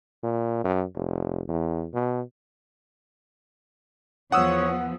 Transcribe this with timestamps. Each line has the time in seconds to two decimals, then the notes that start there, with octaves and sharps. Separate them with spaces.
0.23 A#2
0.64 F#2
0.95 F1
1.49 E2
1.94 B2
4.32 E2 F3 B3 C#5 F#5 D#6 E6